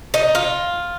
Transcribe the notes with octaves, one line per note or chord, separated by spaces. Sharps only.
D#4
F4